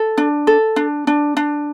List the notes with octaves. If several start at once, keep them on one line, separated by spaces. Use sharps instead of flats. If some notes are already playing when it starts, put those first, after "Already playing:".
Already playing: A4
D4
A4
D4
D4
D4